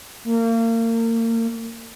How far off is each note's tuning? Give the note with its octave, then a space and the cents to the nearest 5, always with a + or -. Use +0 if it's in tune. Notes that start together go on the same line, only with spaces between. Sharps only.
A#3 -35